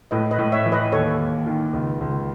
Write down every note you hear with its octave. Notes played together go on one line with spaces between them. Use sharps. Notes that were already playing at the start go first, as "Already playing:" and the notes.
A2 B4 D#5
B4 D#5
A2
C#5 E5
E3
B4 D#5
D#2 A4 C#5
D#2
D#3
C#2
C#2